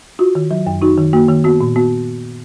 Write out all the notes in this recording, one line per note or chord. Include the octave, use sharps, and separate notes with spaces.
F4 F#4
D#3
F#3
F#2
D#4 F#4
D#3
A#3 F#4
D#3
B3 F#4
A#2
B3 F#4